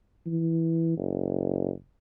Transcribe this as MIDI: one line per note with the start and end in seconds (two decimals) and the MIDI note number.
0.26 0.92 52
0.97 1.70 30